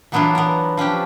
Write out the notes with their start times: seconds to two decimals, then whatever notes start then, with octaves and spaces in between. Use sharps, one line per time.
0.12 E3 F#3 B3 D4 E4 F4
0.35 B3 A#4
0.77 F3 C#4 D4 G4